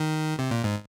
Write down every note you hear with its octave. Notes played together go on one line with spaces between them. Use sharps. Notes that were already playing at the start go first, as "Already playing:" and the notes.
Already playing: D#3
C3
A#2
G#2